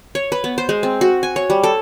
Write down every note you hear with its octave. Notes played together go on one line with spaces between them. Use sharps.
C#5
B4
B3
C5
G#3
C4
F#4
G#5
C#5
G3
A4